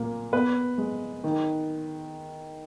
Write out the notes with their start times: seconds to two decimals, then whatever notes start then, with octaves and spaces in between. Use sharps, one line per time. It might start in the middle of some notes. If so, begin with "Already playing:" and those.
Already playing: A#2 A#3
0.33 B3 B4
0.78 G#3
1.24 D#3